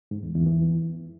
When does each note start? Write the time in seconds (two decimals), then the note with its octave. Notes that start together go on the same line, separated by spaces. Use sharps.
0.11 G#2
0.23 E2
0.35 E2
0.46 E3